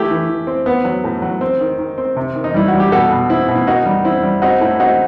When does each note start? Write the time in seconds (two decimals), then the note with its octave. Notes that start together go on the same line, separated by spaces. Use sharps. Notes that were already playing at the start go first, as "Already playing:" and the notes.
Already playing: A3 E4 G4
0.10 E3
0.29 E3
0.47 C4
0.66 B3
0.85 F#3
1.04 A2
1.22 F#3
1.41 C4
1.61 D#3
1.79 D#3
1.98 C4
2.17 C3
2.35 D#3
2.44 D#4
2.54 G3 E4
2.68 F#4
2.74 G3
2.80 G4
2.91 B2 F#4 A4
3.10 B2
3.30 C4 E4
3.49 B2
3.55 E4
3.67 D#3 D#4 F#4
3.85 G3
4.05 C4 E4
4.23 G3
4.42 C4 D#4 F#4
4.61 A2 E4
4.79 C4 D#4 F#4